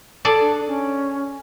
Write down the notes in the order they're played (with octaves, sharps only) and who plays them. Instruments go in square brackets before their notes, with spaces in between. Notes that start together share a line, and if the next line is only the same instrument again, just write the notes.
[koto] G#4 A4 D5
[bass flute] D4
C#4